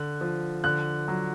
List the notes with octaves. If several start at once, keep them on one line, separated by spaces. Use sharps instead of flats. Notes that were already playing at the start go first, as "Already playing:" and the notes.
Already playing: D3 F#6
F3
D3 F#6
F#3